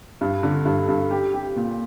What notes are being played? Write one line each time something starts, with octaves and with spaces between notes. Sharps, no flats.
G2
D3
G2
G2
G4
G4
A#2